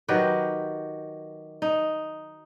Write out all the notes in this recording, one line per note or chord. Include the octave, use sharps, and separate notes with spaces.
D#3 F#3 G4 B4
D#4